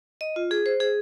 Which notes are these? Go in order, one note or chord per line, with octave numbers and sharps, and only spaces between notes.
D#5
F4
G#4
C5
G#4